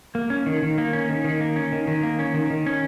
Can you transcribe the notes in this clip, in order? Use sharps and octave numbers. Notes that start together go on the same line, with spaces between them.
A#3
C#4
D#3
D#3
A#3
C#4
D#3
D#3
A#3
C#4
D#3
D#3
A#3
C#4
D#3
D#3
C#4